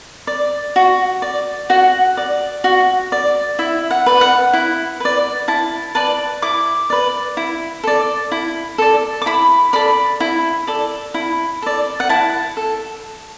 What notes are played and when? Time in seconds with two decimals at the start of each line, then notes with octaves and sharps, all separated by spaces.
0.27 D5
0.76 F#4
1.22 D5
1.70 F#4 F#5
2.17 D5
2.64 F#4
3.12 D5
3.59 E4 E5
3.91 F#5
4.06 B4 D5
4.21 F#5
4.53 E4
5.00 B4 D5
5.48 E4 A5
5.95 B4 D5 A5
6.42 E4 D6
6.90 B4 D5
7.37 E4
7.84 A4 D5
8.32 E4
8.78 A4 D5
9.22 D6
9.26 E4 B5
9.73 A4 D5 B5
10.20 E4
10.67 A4 D5
11.14 E4
11.62 A4 D5
12.00 F#5
12.09 E4 A5
12.57 A4